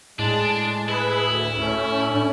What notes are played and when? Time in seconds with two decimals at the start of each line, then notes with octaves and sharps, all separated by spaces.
0.19 A2 G#3 D4 A5
0.89 E4 G#4 B4
1.27 D2
1.58 A2 A3 C#4
2.10 D4